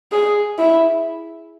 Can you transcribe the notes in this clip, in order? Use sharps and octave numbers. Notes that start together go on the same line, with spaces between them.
G#4
E4